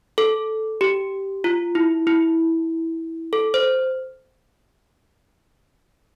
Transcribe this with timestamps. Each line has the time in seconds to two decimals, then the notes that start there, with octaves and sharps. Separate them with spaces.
0.18 A4
0.81 G4
1.44 F4
1.75 E4
2.07 E4
3.33 A4
3.54 C5